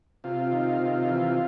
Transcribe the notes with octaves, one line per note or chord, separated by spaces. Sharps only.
C3 F4
D#3
C3
E3